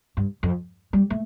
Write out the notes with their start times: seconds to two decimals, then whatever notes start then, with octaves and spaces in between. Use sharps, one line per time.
0.17 G2
0.43 F2
0.93 G3
1.10 A3